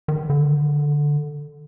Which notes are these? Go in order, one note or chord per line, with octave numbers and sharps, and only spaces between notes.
D#3
D3